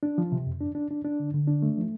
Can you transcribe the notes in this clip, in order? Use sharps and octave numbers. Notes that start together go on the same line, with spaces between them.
D4
F3
C3
F2
D4
D4
D4
D4
D3
D3
D4
A3
F3